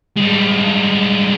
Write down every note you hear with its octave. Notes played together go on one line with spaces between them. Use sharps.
G2 G#3